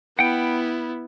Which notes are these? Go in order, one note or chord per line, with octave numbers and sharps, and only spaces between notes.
B3 E4 F#5 G5